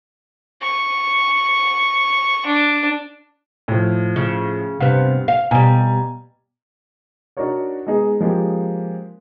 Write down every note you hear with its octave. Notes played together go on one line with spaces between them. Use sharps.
C#6
D4
A2 F3
C#3
G2 C3 B3 F5
F5
B2 G3 G#5 A#5
D4 D#4 F#4 A#4 C#5 D5
G#3 B3 D#4 G#4
F3 G#3 A#3 C#4 G4